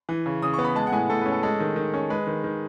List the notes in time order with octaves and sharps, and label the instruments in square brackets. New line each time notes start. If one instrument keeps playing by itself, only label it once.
[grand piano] E3
C#3
C#3 D#6
B3 C#6
B5
G#3 A5
F#5
A2 G#5
A2 A4
C#4 B4
A4
G#3 A4
D#3
D#3
C#4
G#3 B4
D#3
D#3